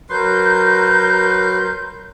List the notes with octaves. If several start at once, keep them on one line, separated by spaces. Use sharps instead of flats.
F#3 A#4 B4 C6 G6